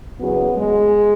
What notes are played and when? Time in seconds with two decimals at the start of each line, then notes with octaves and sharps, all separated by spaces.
0.18 E2 C#3 F#3 B3
0.57 G#3